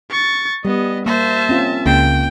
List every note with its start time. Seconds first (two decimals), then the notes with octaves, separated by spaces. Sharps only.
0.11 C#6 A6
0.65 G3 B3 D#5
1.06 A#3 C5 E5 A5
1.49 C4 C#4 F4
1.86 C#2 C#3 A#3 G5